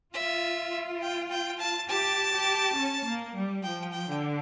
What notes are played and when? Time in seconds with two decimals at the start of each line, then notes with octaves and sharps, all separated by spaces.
0.14 F4 E5
1.02 G5
1.30 G5
1.59 A5
1.89 G4 A5
2.32 G4
2.76 C#4
3.05 A#3
3.34 G3
3.63 F3 G5
3.92 G5
4.07 D3